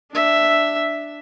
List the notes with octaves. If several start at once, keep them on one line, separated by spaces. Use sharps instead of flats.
D4 E5